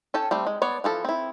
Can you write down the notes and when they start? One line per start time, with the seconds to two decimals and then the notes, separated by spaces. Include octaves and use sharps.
0.14 C#4 A4 G5 A5
0.31 G3 A3 C4
0.47 G#3
0.62 B3 C#5 D5
0.84 E3 F3 A4
1.05 C4 E4